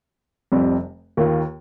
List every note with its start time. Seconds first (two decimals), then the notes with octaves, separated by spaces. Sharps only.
0.52 F1 F2 C3 G3 C4
1.17 D#2 D#3 A#3 F4